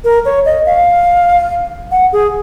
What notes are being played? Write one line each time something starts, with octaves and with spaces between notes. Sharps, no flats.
A#4
C#5
D#5
F5
F#5
G#4